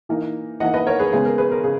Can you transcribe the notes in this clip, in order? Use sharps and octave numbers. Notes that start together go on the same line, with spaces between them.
E3 A#3 D#4
E3 A#3 D#4 D#5 F#5
B4 D#5
A#4 C#5
G#4 B4
C#3 G#3 B3 G#4
A#4
G#4 B4
A#4
C#3 G#4